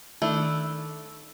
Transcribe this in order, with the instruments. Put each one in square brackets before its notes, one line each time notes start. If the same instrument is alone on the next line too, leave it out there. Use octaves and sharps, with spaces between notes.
[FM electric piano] D#3 [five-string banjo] A3 D4 E4